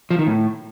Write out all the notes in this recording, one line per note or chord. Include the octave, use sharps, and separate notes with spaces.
F3
D#3
A2